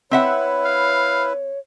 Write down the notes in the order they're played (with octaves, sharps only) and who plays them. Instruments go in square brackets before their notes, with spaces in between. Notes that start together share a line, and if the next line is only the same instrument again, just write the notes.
[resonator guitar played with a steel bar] C4 E5 F#5 [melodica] E4 B4 [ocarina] C#5
[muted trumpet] F5